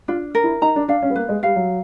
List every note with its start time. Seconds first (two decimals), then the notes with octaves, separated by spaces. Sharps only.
0.08 D4 F4
0.35 A#4
0.44 E4
0.62 D#4 A#5
0.76 D4
0.88 D4 F5
1.02 C#4
1.10 B3
1.16 A#3 B4
1.29 G#3
1.43 G3 F5
1.56 F#3